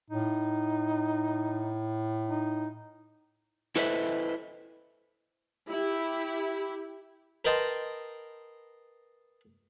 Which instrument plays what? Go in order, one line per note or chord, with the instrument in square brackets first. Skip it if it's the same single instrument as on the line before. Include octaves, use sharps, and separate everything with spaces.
[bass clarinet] A2 [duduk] D#4
[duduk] D#4
[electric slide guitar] E4 A4 B4 C5 D#5 E5
[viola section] E4 G4
[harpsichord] A#4 B4 D#5 G5 A5 C6